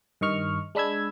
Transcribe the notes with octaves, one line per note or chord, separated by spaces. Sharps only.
G2 D#3 D#5 C#6 F6
G#3 D4 B5 E6 G#6